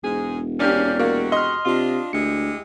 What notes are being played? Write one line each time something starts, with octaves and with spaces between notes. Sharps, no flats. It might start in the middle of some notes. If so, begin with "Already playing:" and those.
E1 G#2 G#4
C3 A#3 C#4 D4 G4 D5 F6 G6
C3 G#3 A#3 F#4
D#5 C6 F6
C3 D4 F4
D2 G#3 E4 G4 C#7